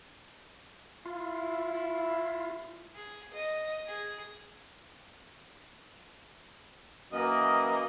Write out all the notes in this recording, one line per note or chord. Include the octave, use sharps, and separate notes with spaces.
E4 F4
G#4
D#5
G#4
F#2 E3 A#3 D#5